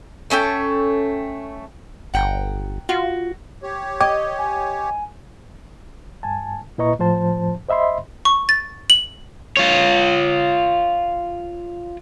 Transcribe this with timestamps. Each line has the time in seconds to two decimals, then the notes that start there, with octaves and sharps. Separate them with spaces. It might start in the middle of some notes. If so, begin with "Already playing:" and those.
0.30 A3 C#4 A4 G5
2.14 G1 F#5 G5 A#5
2.89 F4 F#4
3.63 G4 C#5
4.01 D#5 G5 D6 G#6
4.39 G#5
6.23 G2 G#5 A5
6.78 A#2 E4 B4 D#5 A#5 C#6
6.99 A2 F3 C5 A5
7.69 C5 D#5 E5 B5 C6
8.25 C#6
8.49 A6
8.90 F#7
9.57 F4 C#5